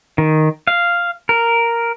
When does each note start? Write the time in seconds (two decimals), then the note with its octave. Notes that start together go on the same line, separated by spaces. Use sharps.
0.18 D#3
0.67 F5
1.29 A#4